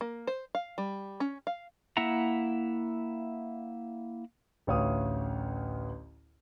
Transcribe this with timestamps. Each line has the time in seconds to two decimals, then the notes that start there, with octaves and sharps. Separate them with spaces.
0.01 A#3
0.27 C5
0.55 F5
0.78 G3
1.20 C#4
1.47 F5
1.97 A#3 E4 E5 F#5 A#5
4.67 A1 D2 C#5 F5 D#6